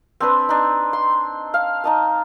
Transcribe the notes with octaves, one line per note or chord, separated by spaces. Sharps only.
C4 D4 B4
D4 D#4
C6
F5
D#4 D#5 A5